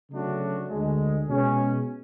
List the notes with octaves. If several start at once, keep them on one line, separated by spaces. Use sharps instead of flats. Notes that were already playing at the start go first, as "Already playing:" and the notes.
C#3 F#3 A3 D4 F#4
D2 D3 G#3
B2 G#3 C#4